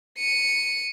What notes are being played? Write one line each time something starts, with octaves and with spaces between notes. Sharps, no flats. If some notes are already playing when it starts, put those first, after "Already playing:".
C#7 D#7